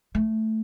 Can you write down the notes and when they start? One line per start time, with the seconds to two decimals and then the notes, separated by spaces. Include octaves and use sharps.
0.15 A3